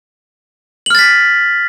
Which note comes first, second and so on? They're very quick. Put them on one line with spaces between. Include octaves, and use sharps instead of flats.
F#7 F6 A6 B6